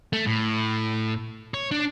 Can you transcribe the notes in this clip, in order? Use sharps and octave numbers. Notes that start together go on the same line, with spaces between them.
A3
A2
C#5
D4